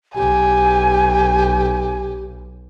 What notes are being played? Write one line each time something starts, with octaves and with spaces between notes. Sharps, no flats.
B1 G4 G#5